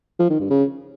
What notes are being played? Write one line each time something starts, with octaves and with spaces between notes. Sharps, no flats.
F3
D#3
G2
C#3